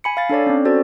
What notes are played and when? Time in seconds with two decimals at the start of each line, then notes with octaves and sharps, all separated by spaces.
0.04 G#5 B5 C#7
0.17 F5 B5 A6
0.29 D4 A4 C#5 D5
0.47 C4 C#4
0.65 F#4 A4 C5 D5